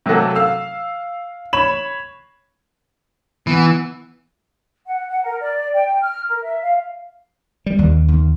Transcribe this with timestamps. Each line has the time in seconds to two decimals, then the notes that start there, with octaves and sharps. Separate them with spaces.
0.06 C3 F#3 A3 A#3 F#4 A4
0.35 F5 E6
1.53 C#5 B5 E7 F#7
3.47 E3 B3
4.85 F#5
5.08 F#5
5.24 A#4
5.41 D5
5.74 G5
6.01 F6
6.28 A#4
6.44 E5
6.62 F5
7.66 G3
7.79 D#2
8.08 D#2